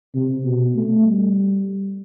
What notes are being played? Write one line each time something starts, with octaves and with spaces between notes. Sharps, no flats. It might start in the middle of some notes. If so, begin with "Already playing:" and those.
C3
B2
A3
G3